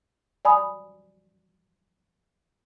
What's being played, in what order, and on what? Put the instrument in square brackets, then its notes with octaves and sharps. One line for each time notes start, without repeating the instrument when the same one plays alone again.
[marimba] D5 G#5 B5 D#6